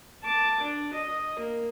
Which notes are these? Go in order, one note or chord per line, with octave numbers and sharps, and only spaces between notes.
A5 D6
D4
D#5
A#3